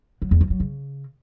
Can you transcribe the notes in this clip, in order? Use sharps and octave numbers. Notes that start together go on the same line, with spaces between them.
F#3
E2
F3
F#3
C#3